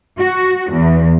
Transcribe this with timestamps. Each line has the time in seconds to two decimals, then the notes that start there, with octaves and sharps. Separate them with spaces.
0.19 F#4
0.72 E2